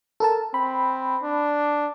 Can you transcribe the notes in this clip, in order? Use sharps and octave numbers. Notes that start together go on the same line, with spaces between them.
A4 A#4 A5
C4 B5
D4